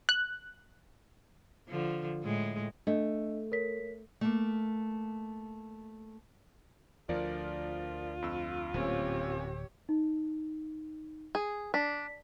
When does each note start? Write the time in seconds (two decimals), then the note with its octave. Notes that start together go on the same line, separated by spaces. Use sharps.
0.09 F#6
1.68 D3 F3
2.23 A2 G#3
2.87 A3 D4 D#5
3.52 A#4 C#5 B6
4.21 A3 A#3
7.09 D2 F3 F4 A#4 D5
8.22 F2 E6
8.74 D1 A#2 C4 C#4 G4 C#5
9.89 D#4
11.35 G#4
11.74 D4 B6